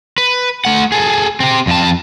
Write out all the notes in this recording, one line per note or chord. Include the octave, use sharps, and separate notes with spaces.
B4
A3 F#5
G#4 A4
C4 G4
F2 A5